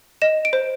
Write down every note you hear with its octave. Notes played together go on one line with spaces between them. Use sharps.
D#5 E7
D7
C5